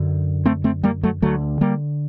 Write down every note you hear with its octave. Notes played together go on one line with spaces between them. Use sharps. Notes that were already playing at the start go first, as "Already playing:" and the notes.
Already playing: F#2 D3
A3 C4
A3 C4
G3 A#3
F#3 A3
D2 D3 F#3 A3
G3 A#3